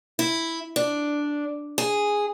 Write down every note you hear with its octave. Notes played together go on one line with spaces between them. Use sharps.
E4
D4
G#4